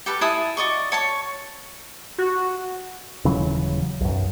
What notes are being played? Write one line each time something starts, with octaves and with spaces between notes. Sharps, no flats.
G4 A4 B4
E4 G#5 A5 D#6
F#4 D5 D#5 C#6
C#5 A5 C#6
F#4
D#1 C#3 E3 F#3
B1 F#2